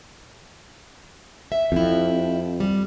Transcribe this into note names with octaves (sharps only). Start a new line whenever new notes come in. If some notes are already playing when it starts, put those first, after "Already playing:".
E5
F2 E4 G4
G3